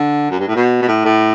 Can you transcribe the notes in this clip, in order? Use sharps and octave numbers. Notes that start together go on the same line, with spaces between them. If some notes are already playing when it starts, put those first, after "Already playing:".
Already playing: D3
F#2
G2
A2
B2
B2
A2
A2